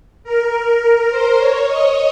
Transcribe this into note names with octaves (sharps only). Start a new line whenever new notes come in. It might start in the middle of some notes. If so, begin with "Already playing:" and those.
A#4
A#4
C5
C#5
D#5